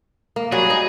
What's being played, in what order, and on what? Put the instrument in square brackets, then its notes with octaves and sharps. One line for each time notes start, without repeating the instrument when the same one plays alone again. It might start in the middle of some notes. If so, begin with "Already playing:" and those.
[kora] A#3
[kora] F#3 G3 F#4 [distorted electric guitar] G#4
[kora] D#4 D#5